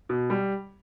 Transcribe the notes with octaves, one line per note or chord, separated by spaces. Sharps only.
B2
G3